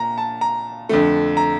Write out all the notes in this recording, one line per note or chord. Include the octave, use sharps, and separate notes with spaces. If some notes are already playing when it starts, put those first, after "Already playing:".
Already playing: A#2 A#5
A5
A#5
F2 D3 A3
A#5